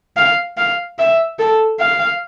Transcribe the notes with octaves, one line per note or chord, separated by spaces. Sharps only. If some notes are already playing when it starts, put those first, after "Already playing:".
F5
F5
E5
A4
F5